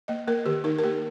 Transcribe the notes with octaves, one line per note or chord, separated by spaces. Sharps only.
A#3 D#5
A#3 A#4
D#3 G4
D#4 A#4
A#4
A#3 G4